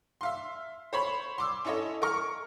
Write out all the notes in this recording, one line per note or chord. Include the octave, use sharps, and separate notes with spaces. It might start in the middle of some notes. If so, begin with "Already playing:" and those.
E5 F5 C6
C5 C#5 B5
C6 D6 E6
C#4 E4 A4 C#5 D#5
A#4 C#6 F6